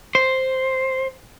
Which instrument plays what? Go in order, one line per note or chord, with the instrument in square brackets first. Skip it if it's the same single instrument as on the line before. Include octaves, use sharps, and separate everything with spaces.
[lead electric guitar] C5